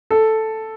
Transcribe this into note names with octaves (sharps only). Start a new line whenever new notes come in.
A4